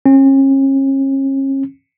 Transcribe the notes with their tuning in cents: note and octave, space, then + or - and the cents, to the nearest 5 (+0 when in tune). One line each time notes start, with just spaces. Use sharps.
C#4 -40